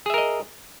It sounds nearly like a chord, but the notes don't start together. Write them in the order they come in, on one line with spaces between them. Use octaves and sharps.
G#4 E5 A#4 D#5